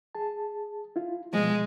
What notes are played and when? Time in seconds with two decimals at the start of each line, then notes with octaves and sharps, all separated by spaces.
0.15 G#4 A5
0.96 E4 F4
1.33 B2 F3 G#3